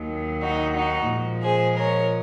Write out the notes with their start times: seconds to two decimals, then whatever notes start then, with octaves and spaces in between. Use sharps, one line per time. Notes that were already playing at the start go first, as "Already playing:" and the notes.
Already playing: D#2 D#3 F#3
0.42 D#4 F#4
0.75 D#4 F#4
1.09 A#2 F3 G#3
1.43 G#4 C5
1.77 A#4 C#5